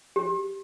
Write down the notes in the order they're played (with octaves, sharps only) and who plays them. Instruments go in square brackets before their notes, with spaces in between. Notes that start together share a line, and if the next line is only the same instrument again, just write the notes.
[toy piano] G4